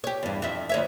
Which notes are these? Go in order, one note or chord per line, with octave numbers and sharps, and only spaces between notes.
G4 C#5
E2 G2
F2 E5
D2 C#5 E5